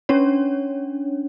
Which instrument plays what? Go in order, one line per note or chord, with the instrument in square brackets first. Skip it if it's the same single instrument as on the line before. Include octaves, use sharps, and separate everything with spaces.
[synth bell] C#4 D4 C#5